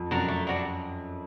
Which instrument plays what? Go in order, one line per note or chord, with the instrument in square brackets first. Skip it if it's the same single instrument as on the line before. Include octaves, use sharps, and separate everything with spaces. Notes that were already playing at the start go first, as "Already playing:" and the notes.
Already playing: [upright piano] F2
[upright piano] F#2 [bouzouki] D4 F#4 A#4
[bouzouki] A3
D4 F#4 A#4